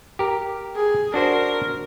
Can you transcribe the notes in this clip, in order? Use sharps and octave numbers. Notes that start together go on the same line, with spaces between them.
G4 A#4
G#4
D4 F#4 A#4 C5